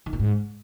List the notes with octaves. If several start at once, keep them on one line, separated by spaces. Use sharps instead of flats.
D#3
A#2
G#2